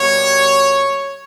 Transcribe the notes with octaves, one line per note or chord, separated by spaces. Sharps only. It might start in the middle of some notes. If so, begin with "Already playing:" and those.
Already playing: B2 G3 A#3 C#5